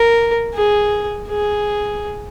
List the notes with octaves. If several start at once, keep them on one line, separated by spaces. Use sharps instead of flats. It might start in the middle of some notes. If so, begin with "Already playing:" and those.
Already playing: A#4
G#4
G#4